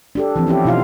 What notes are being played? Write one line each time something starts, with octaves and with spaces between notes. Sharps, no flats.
D4 G4 A4
E3 F3 C4
B3 C#4 E4 G4
B2 D#4 F4 F5